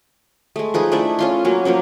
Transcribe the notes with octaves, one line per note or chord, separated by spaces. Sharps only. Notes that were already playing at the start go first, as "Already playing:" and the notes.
G#3 A3
F3 D#4 G#4 B4
A3 D4 E4 A4
C#4 F4 C6
F#3 A#3 C#4
F3 F#3 A#3 C#4